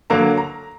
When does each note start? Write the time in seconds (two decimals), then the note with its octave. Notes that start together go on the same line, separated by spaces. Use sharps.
0.10 D3 F#3 A#3 A#5
0.38 A#5